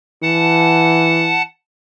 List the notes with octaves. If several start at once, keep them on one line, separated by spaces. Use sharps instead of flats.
E3 F#5 A5